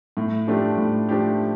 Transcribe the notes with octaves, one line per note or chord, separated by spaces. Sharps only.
A2
F3 A3 D4 G4
A2
F3 A3 D4 G4